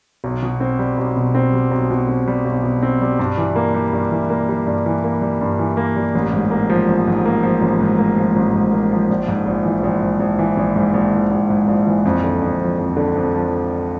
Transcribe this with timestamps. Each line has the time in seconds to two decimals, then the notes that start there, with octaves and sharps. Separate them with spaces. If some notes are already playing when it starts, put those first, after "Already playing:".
0.24 B1
0.43 B2
0.60 C4
0.79 G3
0.98 B1
1.17 B2
1.35 C4
1.53 G3
1.71 B1
1.91 B2
2.09 C4
2.28 G3
2.45 B1
2.64 B2
2.82 C4
3.01 G3
3.19 G2
3.38 E3
3.55 A#3
3.74 G3
3.93 G2
4.11 E3
4.30 A#3
4.49 G3
4.67 G2
4.86 E3
5.04 A#3
5.22 G3
5.41 G2
5.59 E3
5.77 A#3
5.96 G3
6.15 A1
6.33 G#2
6.51 A#3
6.69 F3
6.88 A1
7.07 G#2
7.26 A#3
7.43 F3
7.62 A1
7.81 G#2
7.98 A#3
8.18 F3
8.36 A1
8.54 G#2
8.72 A#3
8.91 F3
9.10 A#1
9.28 G#2
9.46 A#1
9.65 E3
9.83 A#1
10.03 G#2
10.20 A#1
10.39 E3
10.57 A#1
10.76 G#2
10.94 A#1
11.13 E3
11.31 A#1
11.50 G#2
11.68 A#1
11.87 E3
12.05 F2
12.24 D3
12.41 F2
12.61 F3
12.79 F2
12.97 D3
13.15 F2
13.34 F3